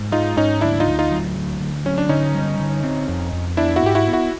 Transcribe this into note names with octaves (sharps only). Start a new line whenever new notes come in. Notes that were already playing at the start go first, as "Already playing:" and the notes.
Already playing: G#2
G#3 D#4 F4
G#2 C#4 D#4
D2 D4 E4
D#4 F4
D2
D#4 F4
F#3
D2
D2
F#3 C#4
D4
D3 C#4 D#4
G3
D3
C4
F2
F2
B3 D4 E4
E4 F#4
G#2 G4
E4 F#4
B3
E4 F#4